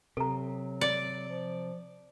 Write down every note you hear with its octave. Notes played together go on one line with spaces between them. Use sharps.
C3 F#3 A4 A#5
D5
F3